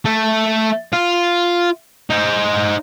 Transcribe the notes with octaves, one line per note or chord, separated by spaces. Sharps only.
A3
F4
D#4 C5